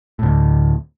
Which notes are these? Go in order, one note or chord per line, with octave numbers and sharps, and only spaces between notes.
D2 A2